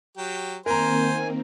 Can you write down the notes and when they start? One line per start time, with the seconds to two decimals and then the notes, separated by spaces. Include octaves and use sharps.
0.18 F#3 G4
0.66 D#3 A#3 C4 A#4 C5 G#5 A#5